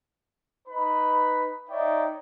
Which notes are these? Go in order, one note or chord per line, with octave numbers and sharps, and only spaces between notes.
D#4 B4 B5
D#4 C#5 D5 E5 G5